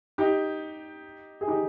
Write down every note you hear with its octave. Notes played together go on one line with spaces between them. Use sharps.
D#4 G4
G#4
D#4 G4